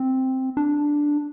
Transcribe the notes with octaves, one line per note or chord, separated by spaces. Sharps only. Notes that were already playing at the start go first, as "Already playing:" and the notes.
Already playing: C4
D4